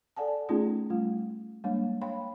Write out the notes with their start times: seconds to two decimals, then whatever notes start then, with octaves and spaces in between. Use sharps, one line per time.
0.17 A4 D5 F#5 G#5 A5
0.49 A3 B3 C#4 D#4 F4 G#4
0.90 G3 A3 F4
1.64 G3 G#3 A#3 D4 C#5
2.02 C#5 F5 G5 B5 C6